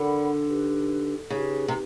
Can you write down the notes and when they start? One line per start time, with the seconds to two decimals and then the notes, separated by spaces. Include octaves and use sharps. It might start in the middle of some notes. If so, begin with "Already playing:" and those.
Already playing: D3 A#4 D5 F#5 B5
0.45 D#4 G4 B4
1.30 C#3 D#4 G4 B4
1.68 C3